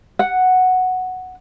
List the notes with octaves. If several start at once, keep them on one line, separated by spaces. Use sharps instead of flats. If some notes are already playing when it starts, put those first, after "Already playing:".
F#5